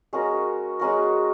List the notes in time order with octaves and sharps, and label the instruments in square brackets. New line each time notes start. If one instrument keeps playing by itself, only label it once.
[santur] G#3 C#4 F#4 A#4
G#3 C#4 F#4 A#4